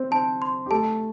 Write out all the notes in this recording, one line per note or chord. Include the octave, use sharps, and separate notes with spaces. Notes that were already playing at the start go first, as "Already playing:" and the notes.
Already playing: C4 C5
C4 C5 A5
C6
G4
A3 A4 A5